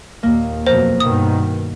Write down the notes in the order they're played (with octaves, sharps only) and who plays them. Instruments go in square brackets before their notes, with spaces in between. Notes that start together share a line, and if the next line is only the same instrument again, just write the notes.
[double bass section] D#2 A#2 [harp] A#3
[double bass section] F2 B2 F#3 [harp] A#4 [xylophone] C5
[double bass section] G2 B2 D#3 [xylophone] D#6